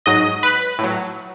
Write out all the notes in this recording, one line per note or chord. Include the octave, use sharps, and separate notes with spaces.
G#2 F#3 D#5
B4
A2
F#3